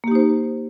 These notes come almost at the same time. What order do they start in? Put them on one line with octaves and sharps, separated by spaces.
A#3 G4 D#4 C5